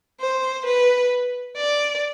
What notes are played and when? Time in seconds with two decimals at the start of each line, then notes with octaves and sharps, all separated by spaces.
0.20 C5
0.66 B4
1.57 D5